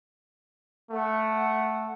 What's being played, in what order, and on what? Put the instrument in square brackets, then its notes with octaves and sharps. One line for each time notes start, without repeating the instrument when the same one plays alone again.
[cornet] A3 [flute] F#5